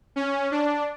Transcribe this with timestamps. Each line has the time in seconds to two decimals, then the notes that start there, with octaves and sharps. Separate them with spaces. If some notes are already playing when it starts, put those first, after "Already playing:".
0.16 C#4
0.52 D4